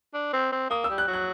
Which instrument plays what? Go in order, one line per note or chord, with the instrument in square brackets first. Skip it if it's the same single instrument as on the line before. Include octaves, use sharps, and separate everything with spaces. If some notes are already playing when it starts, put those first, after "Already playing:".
[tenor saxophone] D4
C4
C4
[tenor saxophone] A#3 [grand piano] D#6
[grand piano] E6
[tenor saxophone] G3
[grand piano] F#6
[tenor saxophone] F#3
[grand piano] F#6